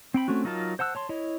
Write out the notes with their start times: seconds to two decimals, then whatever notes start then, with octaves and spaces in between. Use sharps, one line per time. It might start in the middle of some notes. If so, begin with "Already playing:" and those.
0.14 C4 G5 B5
0.28 A3 C4 C#4 F#4
0.44 F#3 D#4 F4 A#4 A5
0.79 C5 F#5 A5 E6 F#6
0.95 C#5 A5 C6
1.09 E4 C#5 D#5